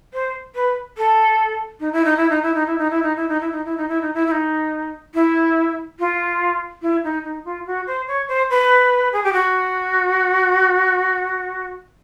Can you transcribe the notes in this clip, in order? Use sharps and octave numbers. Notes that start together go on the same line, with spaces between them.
C5
B4
A4
D#4
E4
D#4
E4
D#4
E4
D#4
E4
D#4
E4
D#4
E4
D#4
E4
D#4
E4
D#4
E4
D#4
E4
E4
D#4
E4
F4
E4
D#4
D#4
F4
F#4
C5
C#5
C5
B4
G#4
G4
F#4